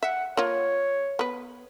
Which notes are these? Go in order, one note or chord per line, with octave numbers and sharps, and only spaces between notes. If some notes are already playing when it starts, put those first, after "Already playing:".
E5 F#5
A#3 F4 C#5
B3 B4